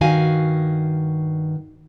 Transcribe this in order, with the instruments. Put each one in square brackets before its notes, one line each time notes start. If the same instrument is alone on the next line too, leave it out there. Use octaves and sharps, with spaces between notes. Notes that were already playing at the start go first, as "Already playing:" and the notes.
[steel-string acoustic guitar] G2 D#3 F#4 F5 G#5